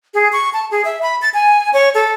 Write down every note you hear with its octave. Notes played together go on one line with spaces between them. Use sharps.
G#4
C#6
A5
G#4
E5
B5
A6
G#5
C#5
A4